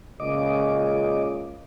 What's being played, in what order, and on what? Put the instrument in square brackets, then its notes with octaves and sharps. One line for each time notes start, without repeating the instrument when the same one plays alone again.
[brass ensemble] C#2 A#2 C#3 [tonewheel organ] D#5 D6